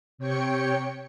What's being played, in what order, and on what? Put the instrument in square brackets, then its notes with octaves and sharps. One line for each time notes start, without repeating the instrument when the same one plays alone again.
[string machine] C3 C#5 G5 C#7